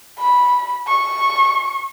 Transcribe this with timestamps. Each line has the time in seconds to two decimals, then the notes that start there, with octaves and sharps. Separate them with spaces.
0.18 B5
0.87 C#6